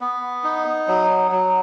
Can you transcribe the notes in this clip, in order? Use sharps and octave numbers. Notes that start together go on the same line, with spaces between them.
B3
D#4
F#3
F#3